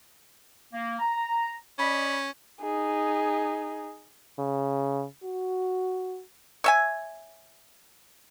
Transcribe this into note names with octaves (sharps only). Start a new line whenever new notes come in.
A#3
A#5
C#4 D5 D#5 B5
D#4 G#4
C#3
F#4
C#5 E5 G#5